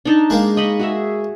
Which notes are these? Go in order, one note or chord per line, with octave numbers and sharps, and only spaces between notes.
D4 D#4 A5
G#3 A#3
D#5 B5 C#6
F#4 G#4 E5